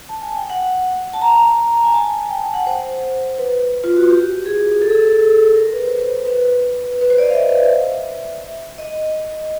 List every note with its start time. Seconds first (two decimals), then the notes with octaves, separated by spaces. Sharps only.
0.09 A5
0.22 G#5
0.36 G5
0.50 F#5
1.13 A5
1.21 A#5
1.84 G#5
1.94 A5
2.29 G5
2.42 G5
2.54 F#5
2.67 C5
3.38 B4
3.84 F4
3.97 F#4
4.10 G4
4.46 G#4
4.82 A4
4.90 G#4
4.97 A4
5.55 A#4
5.73 B4
5.85 C5
5.98 B4
6.25 B4
7.01 B4
7.10 C5
7.18 D5
7.23 D#5
7.30 F5
7.34 E5
8.78 D#5